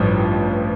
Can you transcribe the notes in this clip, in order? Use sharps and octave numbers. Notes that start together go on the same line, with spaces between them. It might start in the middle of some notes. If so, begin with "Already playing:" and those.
Already playing: A1 G2 F3